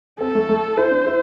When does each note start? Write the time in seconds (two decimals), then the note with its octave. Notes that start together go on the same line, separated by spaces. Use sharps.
0.20 C4 A4
0.35 A3
0.49 A3
0.77 E4 C5
0.91 D4
1.06 E4